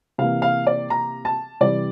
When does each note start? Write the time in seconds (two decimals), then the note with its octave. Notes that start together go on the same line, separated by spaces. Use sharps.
0.18 C3 E3 A#3 F5
0.42 F5
0.67 D5
0.90 A#5
1.25 A5
1.61 C3 E3 G3 D5